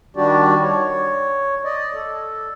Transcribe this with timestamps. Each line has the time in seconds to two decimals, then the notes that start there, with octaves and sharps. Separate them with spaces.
0.16 D#3 G3 D4 F#4 G4 D5
0.63 C#5
1.65 D5 D#5
1.94 A4